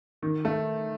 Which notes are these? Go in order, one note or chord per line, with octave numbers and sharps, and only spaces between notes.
D#3
A3